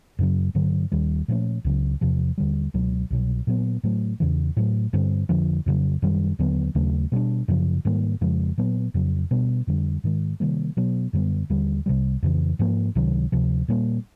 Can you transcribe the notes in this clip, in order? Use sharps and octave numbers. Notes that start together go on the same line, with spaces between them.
F#2 C#3 F#3
G2 D3 F#3
D#2 D#3 G3
A#2 F3 A3 C#4
C#2 C#3 F#3
E2 C3 F3
D#2 D3 G3
C#2 B2 F#3
C2 B2 F#3
A#2 F#3 B3
A2 F#3 A3
E2 C#3 E3
A2 F#3 A3
G2 D3 G3 C4
F2 D3 F3
F2 C#3 F#3
F#2 D#3 G3
D#2 D3 F#3 B3
D#2 C#3 F#3 A3
B2 G3 B3 D4
F#2 C#3 F3
G#2 D#3 G3 A#3
F2 C#3 F3 G#3
A#2 F#3 B3
F2 C#3 F#3
B2 G3 B3 D4
F2 D3 G3
G#2 D#3 G#3
C3 D#3 G3 A#3
B2 F#3 B3
F#2 D3 G3 B3
D#2 D3 G3
C2 C3 E3 G3
F2 C#3 E3
G#2 F3 A#3
C#2 C3 D#3 F#3
D2 C3 F3
A#2 G3 A#3